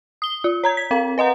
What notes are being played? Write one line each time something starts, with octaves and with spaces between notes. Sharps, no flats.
D#6 G7
F4
C#5 A#5 G#6
B6
C4 A#4 F5
B4 D#5 F#5 A#5